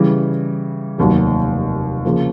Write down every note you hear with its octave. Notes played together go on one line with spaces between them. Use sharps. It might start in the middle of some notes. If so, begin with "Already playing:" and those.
Already playing: C#3 E3 G3
F1 D#2 D#3 F#3
C#3 F3 A#3